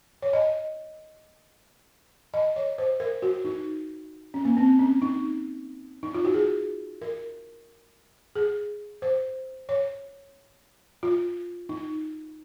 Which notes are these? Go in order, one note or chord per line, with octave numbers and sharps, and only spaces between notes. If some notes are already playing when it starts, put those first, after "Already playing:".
C#5
D#5
D#5
C#5
C5
A#4
F#4
D#4
C#4
A#3
C4
C#4
D#4
D#4
F4
F#4
G#4
A#4
G#4
C5
C#5
F4
D#4